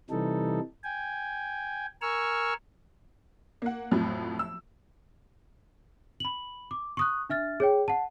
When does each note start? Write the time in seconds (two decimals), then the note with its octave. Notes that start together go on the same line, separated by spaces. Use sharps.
0.10 C3 E3 G3 D#4 A4
0.84 G5 G#5
2.02 A#4 G#5 C#6 E6 F6
3.62 A#3 F#5
3.91 F2 A2 F3 F#3
4.39 E6
6.20 B5 F#7
6.71 D6
6.97 C#6 D#6 F#6
7.29 D4 E5 F6 A6
7.60 G#4 C#5 G5
7.88 F#5 A5